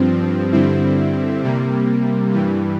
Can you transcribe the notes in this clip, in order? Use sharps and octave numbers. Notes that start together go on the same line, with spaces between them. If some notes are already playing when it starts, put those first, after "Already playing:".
Already playing: G2 F3 C4
G2 D3 G3 C4 E4
C3 G3 A#3
G2 E3 G3